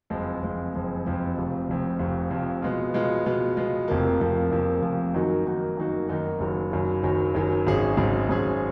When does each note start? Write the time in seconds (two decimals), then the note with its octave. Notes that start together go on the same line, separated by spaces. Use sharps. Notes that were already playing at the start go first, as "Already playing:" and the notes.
0.10 F#1 F2 F3 G#3
0.42 F#1 F2 F3 G#3
0.74 F#1 F2 F3 G#3
1.05 F#1 F2 F3 G#3
1.36 F1 F2 F3
1.68 F1 F2 F3
1.99 F1 F2 F3
2.31 F1 F2 F3
2.62 B2 G#3 B3 F4
2.94 B2 G#3 B3 F4
3.26 B2 G#3 B3 F4
3.57 B2 G#3 B3 F4
3.88 F1 F2 F3 A#3
4.20 F1 F2 F3 A#3
4.51 F1 F2 F3 A#3
4.82 F1 F2 F3 A#3
5.14 F#2 D#3 A#3 D#4 F#4
5.45 F#2 D#3 A#3 D#4 F#4
5.77 F#2 D#3 A#3 D#4 F#4
6.08 F#2 D#3 A#3 D#4 F#4
6.40 F#1 F#2 D#3 F#3
6.72 F#1 F#2 D#3 F#3
7.03 F#1 F#2 D#3 F#3
7.35 F#1 F#2 D#3 F#3
7.66 G#1 G#2 F#3 C#4 G#4
7.97 G#1 G#2 F#3 C#4 G#4
8.29 G#1 G#2 F#3 C#4 G#4